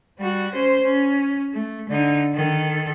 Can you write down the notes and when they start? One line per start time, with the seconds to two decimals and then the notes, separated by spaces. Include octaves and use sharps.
0.19 G3 F#4
0.52 C#4 C5
0.83 C#4
1.54 A3
1.89 D3 D#4
2.35 D#3 A4